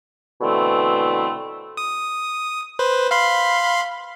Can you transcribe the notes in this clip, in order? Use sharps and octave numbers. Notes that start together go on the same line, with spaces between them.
B2 D3 E3 A3 C4
D#6
B4 C5
F5 B5 C6